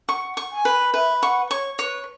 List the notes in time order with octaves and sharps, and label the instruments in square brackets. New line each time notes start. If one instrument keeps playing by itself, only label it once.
[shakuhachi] F#5 [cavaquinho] C#6
[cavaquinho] C#6
[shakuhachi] G#5
[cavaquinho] B4
[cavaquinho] B4 [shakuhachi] E5
[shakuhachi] F#5 [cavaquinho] C#6
[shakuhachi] C#5 [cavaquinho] C#6
[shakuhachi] B4 [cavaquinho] C#5